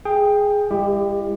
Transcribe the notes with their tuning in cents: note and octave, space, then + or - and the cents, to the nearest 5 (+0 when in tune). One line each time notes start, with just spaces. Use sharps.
G#4 +0 G5 +15
G#3 -45 E4 +35 G4 +20